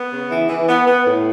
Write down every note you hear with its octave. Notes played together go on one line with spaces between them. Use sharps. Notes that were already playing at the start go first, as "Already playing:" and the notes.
Already playing: B3
C#3
E3
E3
B3
B3
A2